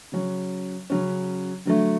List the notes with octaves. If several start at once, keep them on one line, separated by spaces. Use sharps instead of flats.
C#3 F#3 C#4
C#3 F#3 C#4
D3 F#3 A3